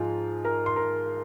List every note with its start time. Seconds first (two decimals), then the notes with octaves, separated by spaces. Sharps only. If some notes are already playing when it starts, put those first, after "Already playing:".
Already playing: G#2 F3 F4 G#5
0.45 A#4 A#5
0.66 C6
0.76 A#4 A#5